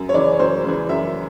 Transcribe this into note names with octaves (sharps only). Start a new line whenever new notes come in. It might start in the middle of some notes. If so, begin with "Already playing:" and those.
Already playing: F#2
C#5
C#3 E3 D5
C#5
F#2 C5
C#3 E3
F#2 E5